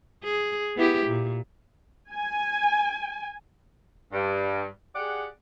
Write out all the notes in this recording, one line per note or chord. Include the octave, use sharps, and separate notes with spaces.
G#4
B3 E4 G4
A#2
G#5
G2
G4 G#4 D5 F#5